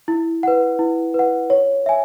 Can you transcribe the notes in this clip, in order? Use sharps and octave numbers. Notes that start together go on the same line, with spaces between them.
E4
B4 F#5
E4
B4 F#5
C#5
E5 G#5